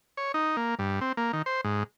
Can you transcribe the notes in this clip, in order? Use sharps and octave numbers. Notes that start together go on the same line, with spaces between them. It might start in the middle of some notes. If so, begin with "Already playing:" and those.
C#5
D#4
A#3
G2
C4
A#3
D#3
C5
G#2